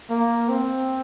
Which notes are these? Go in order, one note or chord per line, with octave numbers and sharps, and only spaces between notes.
A#3
C4